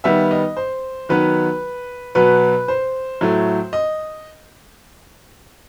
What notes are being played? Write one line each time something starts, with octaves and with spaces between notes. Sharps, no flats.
D#3 G3 B3 E5
D#5
C5
D#3 F#3 B3 B4
B2 F#3 B3 B4
C5
A2 F#3 A3
D#5